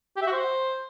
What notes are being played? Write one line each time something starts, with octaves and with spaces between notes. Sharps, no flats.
G4
E5
F#4
C5